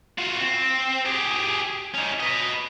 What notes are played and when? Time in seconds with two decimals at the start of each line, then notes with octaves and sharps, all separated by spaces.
0.19 F4 F#4
0.41 C4
1.06 G4 G#4
1.94 C#4 D#4
2.20 B4 D#5